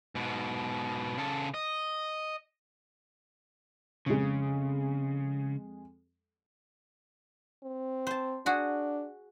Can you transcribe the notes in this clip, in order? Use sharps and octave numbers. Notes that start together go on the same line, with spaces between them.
G#2 B2
C#3 A4
D#5
F2 C#3 G#3
C4
C5 A5
D4 F#4 G#4